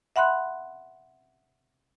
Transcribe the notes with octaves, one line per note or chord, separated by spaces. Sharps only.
E5 F#5 B5 C6 F#6